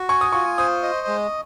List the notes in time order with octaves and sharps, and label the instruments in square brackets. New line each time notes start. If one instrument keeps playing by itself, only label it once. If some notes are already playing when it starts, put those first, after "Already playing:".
Already playing: [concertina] F#4
[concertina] G#5 [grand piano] C#6
[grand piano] D#6
[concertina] F4 [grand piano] C#6
[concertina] C5 [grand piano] D#6
[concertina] D#5
G#3